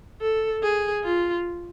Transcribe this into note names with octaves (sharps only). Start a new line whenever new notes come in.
A4
G#4
F4